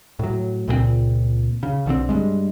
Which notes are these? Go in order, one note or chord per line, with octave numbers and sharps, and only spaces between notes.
A2 F#3
C#2 A#2 F3 C4
C#3
B1 D3 D#3 C4
G2 G#3